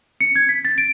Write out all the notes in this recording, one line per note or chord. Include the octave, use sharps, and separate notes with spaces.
C#7
G#6
B6
A6
D7